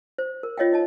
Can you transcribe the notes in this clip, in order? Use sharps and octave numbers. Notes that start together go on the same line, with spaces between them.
C5
A#4
F4 C#5 D#5 F5 G5
D#4 D#5 A5